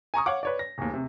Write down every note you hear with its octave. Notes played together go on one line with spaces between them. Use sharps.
G#5 A#5 C#6 D#6
C#5 F5 F#5 D6
B4 C#5 D5
A#6
D1 D#2
C3